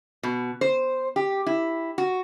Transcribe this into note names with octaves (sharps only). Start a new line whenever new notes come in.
B2
C5
G4
E4
F#4